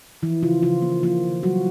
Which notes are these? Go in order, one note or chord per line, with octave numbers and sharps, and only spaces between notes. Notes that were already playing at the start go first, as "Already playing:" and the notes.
E3 F3 E4
C#3 F3 F4
C#3 F3 F4
A#3
F3 A#3 F4
D#3
F#3 G3 F#4